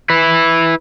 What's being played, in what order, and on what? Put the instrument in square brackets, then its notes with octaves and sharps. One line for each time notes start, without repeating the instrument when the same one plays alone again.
[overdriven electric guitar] E4 B4